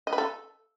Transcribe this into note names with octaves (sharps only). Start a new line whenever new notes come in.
D#5
B4
A4